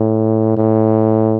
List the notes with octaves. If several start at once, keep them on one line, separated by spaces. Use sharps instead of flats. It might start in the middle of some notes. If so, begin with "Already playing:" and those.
Already playing: A2
A2